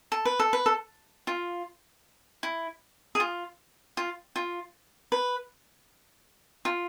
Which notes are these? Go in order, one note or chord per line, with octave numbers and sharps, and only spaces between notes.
A4
B4
A4
B4
A4
F4
E4
G#4
F4
F4
F4
B4
F4